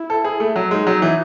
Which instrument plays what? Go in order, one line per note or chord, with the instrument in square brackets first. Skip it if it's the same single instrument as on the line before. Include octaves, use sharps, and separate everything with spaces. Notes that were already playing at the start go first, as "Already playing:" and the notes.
Already playing: [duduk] E4
[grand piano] A4
G#4
A3
F#3
[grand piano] G#3 [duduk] D#4
[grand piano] F#3
E3